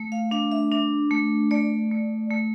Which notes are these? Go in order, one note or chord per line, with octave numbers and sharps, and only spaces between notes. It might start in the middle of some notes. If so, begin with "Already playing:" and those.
Already playing: A3
F5
D4 F5
E5
D4
A3
A3 D5
A3
A3